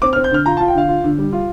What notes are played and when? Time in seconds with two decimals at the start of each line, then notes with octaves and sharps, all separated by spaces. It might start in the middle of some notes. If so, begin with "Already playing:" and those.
0.02 C4 D6
0.13 F6
0.16 C4
0.24 G6
0.31 D3 F6
0.46 F4 A#5
0.57 A5
0.60 F4
0.68 G5
0.75 D3 F5
0.89 F4
1.04 D3
1.18 G3
1.33 F4